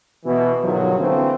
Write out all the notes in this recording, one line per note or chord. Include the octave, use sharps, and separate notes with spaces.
B2 E3
B1 G2 D3 D#3 F3 F#3
D3 E3 F3 A3 A#3 C4